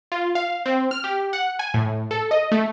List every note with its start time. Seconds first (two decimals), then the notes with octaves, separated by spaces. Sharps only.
0.12 F4
0.35 F5
0.66 C4
0.91 F6
1.04 G4
1.33 F#5
1.59 G#5
1.74 A2
2.11 A4
2.31 D#5
2.52 A3